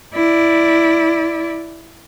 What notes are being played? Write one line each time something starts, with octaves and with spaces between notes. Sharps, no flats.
E4 D5